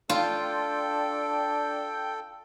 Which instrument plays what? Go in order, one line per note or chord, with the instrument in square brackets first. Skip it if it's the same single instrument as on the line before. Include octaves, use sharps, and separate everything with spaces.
[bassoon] D4 [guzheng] F4 [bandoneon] A4 [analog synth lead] G5